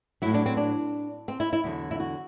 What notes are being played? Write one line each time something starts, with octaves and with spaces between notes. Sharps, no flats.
A2 F#3 E4
D4
C4
D4
C4
E4
E4
E2 D3 F#3 E4
E4
F#4